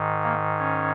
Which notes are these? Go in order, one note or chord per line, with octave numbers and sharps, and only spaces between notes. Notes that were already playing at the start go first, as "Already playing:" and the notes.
Already playing: G#2 D#3
A#3
C#4